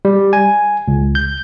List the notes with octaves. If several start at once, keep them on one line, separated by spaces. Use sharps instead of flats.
G3
G#5
C#2
G6